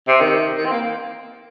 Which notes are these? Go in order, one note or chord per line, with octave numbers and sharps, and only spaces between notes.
C3
D#3
D#3
C4
A#3